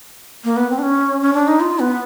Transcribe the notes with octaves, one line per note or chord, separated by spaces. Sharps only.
A#3
B3
C4
D4
C#4
C#4
D4
D#4
F4
B3